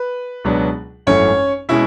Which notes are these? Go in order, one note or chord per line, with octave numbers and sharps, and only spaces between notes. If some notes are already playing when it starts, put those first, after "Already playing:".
Already playing: B4
C#2 B2 F#3 B3 D4
G#1 F#2 E3 A3 C#4 C#5
B2 G#3 C#4 E4 E5